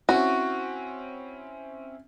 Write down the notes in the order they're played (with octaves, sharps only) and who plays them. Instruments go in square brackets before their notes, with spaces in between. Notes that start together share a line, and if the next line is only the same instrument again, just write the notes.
[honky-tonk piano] C4 C#4 E4 [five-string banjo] F#4